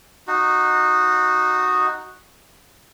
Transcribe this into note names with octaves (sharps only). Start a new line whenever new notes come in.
D#4 F#4